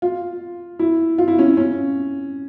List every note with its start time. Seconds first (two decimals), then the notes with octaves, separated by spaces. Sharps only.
0.02 F4
0.79 E4
1.18 F4
1.28 E4
1.38 C#4
1.57 C#4